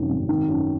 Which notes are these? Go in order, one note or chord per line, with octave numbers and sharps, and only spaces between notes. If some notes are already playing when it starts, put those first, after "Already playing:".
Already playing: F1 F#2 D#3
G#1
D#3
F#2